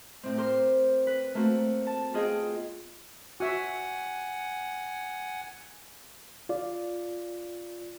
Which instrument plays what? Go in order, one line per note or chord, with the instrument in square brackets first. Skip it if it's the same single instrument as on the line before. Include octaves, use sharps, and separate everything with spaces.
[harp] A2 C4
G4 A#4 C5 C6
B4
A3 A#3 C4 F#4
A5
B3 F4 F#4 G#4 D#5 G5
[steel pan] F#4 E5 [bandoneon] F#5 G#5
[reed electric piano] F4 D5